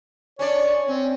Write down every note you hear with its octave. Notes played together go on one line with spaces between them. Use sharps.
C#4 D4 C#5 D5
C4 C#4